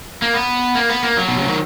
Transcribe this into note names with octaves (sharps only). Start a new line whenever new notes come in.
A#3
B3
A#3
B3
A#3
F#3
B2
C#3
D#3